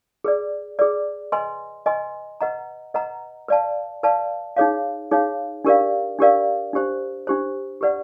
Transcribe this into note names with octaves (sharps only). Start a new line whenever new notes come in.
G#4 B4 D5
G#4 B4 D5
B4 D#5 G#5 C6
B4 D#5 G#5 C6
B4 D#5 F#5 A#5
B4 D#5 F#5 A#5
B4 D5 F5 A5
B4 D5 F5 A5
D#4 G#4 C#5 F5
D#4 G#4 C#5 F5
D4 G4 A#4 D5 F5
D4 G4 A#4 D5 F5
D4 G4 C5
D4 G4 C5
G4 B4 D5 F#5